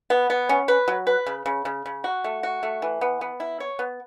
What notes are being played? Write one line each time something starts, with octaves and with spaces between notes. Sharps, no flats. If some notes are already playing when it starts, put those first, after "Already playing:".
B3
B3
C#4
B4
F#3
B4
C#3
C#3
C#3
C#3
F#4
A3
F#4
A3
E3
B3
B3
E4
C#5
B3